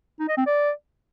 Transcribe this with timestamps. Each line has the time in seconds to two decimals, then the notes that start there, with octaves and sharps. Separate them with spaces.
0.19 D#4
0.28 D#5
0.37 C4
0.46 D5